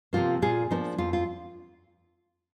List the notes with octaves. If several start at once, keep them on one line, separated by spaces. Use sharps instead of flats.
C3 F3 A#3 F4
A#2 F4 G#4
F3 A#3 D4 D#4
F2 F4
F4